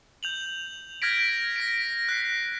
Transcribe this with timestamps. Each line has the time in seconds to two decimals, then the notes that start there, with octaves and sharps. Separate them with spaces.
0.23 G6 F7 F#7
1.02 F6 G6 G#6 A#6 B6 D7
1.56 A#6 B6 D7
2.09 F#6 B6 C7